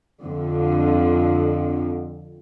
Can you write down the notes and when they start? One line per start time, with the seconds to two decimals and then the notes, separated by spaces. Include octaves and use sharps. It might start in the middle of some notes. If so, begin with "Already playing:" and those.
0.21 F2 D3